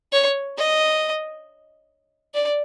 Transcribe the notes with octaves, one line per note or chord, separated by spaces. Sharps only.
C#5
D#5
D5